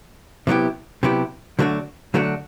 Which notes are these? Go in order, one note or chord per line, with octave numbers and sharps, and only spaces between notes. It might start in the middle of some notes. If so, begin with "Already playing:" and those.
C3 F#3 B3 E4 G4
C3 F#3 B3 E4 G4
D3 F#3 A3 D4 F#4
D3 F#3 A3 D4 F#4